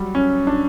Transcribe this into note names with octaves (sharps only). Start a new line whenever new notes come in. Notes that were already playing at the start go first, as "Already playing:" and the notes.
Already playing: F#3 G3
C#4
D4